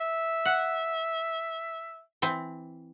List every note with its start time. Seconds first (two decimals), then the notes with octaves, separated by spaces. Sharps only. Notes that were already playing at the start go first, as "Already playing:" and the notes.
0.01 E5
0.45 F#5
2.22 E3 C4